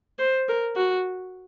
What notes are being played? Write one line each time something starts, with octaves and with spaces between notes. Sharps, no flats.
C5
A#4
F#4